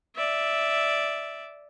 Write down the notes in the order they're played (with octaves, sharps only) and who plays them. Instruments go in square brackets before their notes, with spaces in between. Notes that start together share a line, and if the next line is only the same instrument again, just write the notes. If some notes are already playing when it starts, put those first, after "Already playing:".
[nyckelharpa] D5 E5